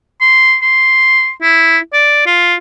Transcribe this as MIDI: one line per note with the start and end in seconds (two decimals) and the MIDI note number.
0.21 0.56 84
0.62 1.30 84
1.42 1.78 64
1.93 2.22 74
2.26 2.55 65